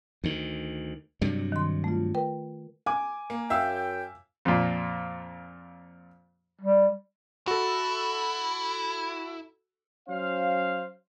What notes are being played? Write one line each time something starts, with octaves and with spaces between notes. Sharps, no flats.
D2 D#3
G2 C3 F#3
D#3 C6
A3 F4
A#4 B4 G5
G#5 D6
A#3
F#2 E5 F5 G5 E6
F2 A#2
G3
E4 F#4 A4
F#3 C#4 C5 F5